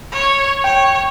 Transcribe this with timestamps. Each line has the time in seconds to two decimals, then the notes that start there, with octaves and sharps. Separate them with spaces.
0.12 C#5
0.64 C#5 G5